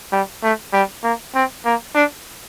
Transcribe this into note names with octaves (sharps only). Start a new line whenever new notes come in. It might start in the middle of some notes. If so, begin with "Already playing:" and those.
G3
A3
G3
A#3
C4
A#3
D4